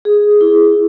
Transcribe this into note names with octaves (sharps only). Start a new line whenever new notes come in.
G#4
E4